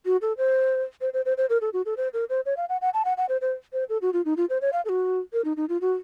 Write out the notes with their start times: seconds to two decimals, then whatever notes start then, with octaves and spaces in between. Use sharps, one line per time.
0.06 F#4
0.22 A4
0.38 C5
1.01 C5
1.13 C5
1.25 C5
1.37 C5
1.50 A#4
1.61 A4
1.73 F#4
1.86 A4
1.97 C5
2.13 A#4
2.30 C5
2.46 C#5
2.57 F5
2.69 F#5
2.81 F#5
2.94 A5
3.05 F#5
3.17 F#5
3.29 C5
3.41 C5
3.73 C5
3.89 A4
4.02 F#4
4.13 F4
4.25 D#4
4.37 F4
4.50 C5
4.61 C#5
4.73 F5
4.85 A4
4.89 F#4
5.33 A#4
5.45 D#4
5.57 D#4
5.69 F4
5.81 F#4